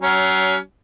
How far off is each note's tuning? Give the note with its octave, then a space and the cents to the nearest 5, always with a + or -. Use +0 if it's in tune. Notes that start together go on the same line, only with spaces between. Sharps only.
F#3 +35 C#4 +25